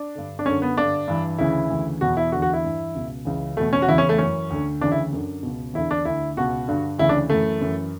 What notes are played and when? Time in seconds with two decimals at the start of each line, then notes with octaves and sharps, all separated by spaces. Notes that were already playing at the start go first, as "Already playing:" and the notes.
Already playing: D4
0.15 G2 D3
0.39 D4
0.46 F#2 D3 C#4
0.62 B3
0.77 G2 D3 D4
1.08 G2 E3
1.39 D2 C#3 E3 E4
1.70 D2 C#3 E3
2.01 E2 B2 F#4
2.17 E4
2.32 E2 D3 F#4
2.42 F#4
2.53 E4
2.64 G2 E3
2.95 C#2 B2
3.25 C#2 C#3 E3
3.57 E2 B2 A3
3.73 C#4
3.82 F#4
3.88 E2 C#3 E3 E4
3.98 C#4
4.09 A3
4.18 F#2 E3 C#4
4.50 D2 D3
4.81 D2 C#3 E3 D4
4.92 E4
5.13 F#2 D3
5.43 C#2 B2
5.74 E2 D3 E4
5.91 D4
6.05 D2 D3 E4
6.37 C#2 B2 F#4
6.68 G2 D3
6.98 D2 C#3 E3 E4
7.09 D4
7.30 F#2 E3 A3
7.61 F#2 E3